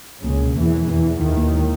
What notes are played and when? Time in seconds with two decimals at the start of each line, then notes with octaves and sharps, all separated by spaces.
0.24 C#2 C#3 A#3
0.41 B2
0.56 E2 E3 A#3
0.73 A#3
0.88 E2 E3 E4
1.05 E4
1.21 D#2 D#3 E4
1.37 A#3
1.54 G#3